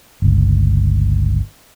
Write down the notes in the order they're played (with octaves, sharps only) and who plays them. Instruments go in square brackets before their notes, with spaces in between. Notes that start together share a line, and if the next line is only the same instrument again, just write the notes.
[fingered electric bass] G1 C#2